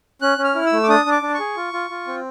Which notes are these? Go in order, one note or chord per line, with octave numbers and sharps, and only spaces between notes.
C#4 F#6
C#4
F6
E4
E6
A3
D6
D4 D#6
D4
D6
D4
C#6
G#4
F4
F4
F4
C4